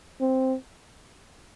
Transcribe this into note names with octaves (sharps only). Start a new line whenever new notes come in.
C4